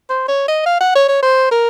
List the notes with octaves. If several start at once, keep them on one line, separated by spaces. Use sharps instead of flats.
C5
C#5
D#5
F5
F#5
C#5
C#5
C5
A#4